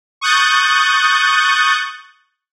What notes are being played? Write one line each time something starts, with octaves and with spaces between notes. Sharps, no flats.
C#6 D#6 F#6 G6 A6